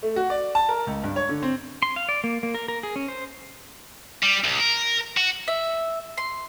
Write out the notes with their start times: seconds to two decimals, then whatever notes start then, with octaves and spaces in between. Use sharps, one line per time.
0.03 A3
0.16 F#4
0.30 D5
0.55 A5
0.69 A#4
0.87 C#2
1.03 G2
1.16 C#5
1.29 D3
1.43 C4
1.83 C6
1.96 F5
2.09 D5
2.24 A#3
2.43 A#3
2.55 A#4
2.68 A#4
2.83 G#4
2.96 C#4
3.08 C5
4.23 G3
4.44 C2
4.60 A#4
5.17 F#4
5.48 E5
6.18 C6